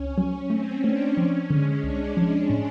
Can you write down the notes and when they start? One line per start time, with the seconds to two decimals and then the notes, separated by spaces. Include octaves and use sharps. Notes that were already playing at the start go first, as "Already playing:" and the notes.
Already playing: C#2 C#4
0.18 F#3
0.50 A3 C4
0.84 A3 D4
1.17 F3 C#4
1.50 D3 G#3
1.83 C2 D4
2.16 F3 D4
2.50 A2